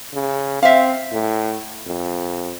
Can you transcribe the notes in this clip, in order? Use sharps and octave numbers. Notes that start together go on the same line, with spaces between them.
C#3
C4 E5 F5
A2
F2